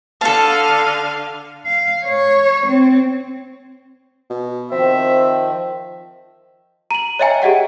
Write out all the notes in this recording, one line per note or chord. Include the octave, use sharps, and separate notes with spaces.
D3 A4 F5 A5
F5
C#5
C4
B2
D#3 F3 C4 C5 E5
A#5 F#7
C#5 D#5 E5 G5 G#5 A#5
G4 G#4 D#5 F#5 G5